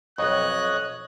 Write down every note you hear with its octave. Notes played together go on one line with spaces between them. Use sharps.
B1 F2 C#5 D#5 F#6